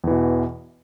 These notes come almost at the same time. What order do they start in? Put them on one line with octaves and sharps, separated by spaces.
E2 E3 B2